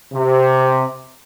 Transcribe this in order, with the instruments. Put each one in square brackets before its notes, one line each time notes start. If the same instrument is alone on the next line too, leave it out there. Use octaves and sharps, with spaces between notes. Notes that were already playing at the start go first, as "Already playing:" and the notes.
[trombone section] C3